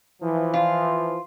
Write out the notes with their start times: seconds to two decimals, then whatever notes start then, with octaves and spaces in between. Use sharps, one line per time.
0.23 E3 F3
0.54 F4